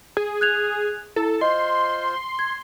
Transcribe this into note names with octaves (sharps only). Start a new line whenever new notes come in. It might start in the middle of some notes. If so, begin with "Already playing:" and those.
G#4
F#6 G#6 F7
E4 A4
F4 C5 D#5 C6
G#6